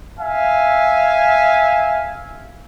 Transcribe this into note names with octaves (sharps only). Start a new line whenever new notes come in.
E5 F5 G#5